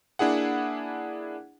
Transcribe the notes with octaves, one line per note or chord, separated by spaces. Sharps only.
A#3 D4 E4 G#4 F#5